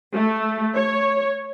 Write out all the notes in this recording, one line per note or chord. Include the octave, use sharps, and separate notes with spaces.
A3
C#5